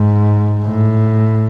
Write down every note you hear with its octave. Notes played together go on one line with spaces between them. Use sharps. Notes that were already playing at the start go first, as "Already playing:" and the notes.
Already playing: G#2
A2